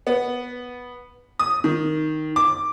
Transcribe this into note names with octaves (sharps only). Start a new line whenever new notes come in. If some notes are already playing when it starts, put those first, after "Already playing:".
B3
D#6
D#3
D6